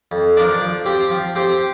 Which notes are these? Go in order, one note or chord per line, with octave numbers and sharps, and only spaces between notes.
F2
F3 D4 A#4 D5
F3
C4 G4 C5
F3
C4 G4 C5